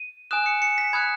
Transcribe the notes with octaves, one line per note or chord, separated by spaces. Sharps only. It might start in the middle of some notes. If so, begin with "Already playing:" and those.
Already playing: D#7
G#5 D#6 F#6 E7
C#7
C#7
B6
B5 D#6 F#6 G#6